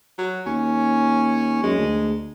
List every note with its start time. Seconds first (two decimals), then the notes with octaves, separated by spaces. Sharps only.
0.18 F#3
0.46 D#2 C#4
1.63 F#2 G#3
1.77 D2